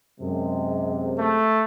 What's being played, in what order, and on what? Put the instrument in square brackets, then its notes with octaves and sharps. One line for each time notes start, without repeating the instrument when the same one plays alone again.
[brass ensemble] F#2 C3 G#3
[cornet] A3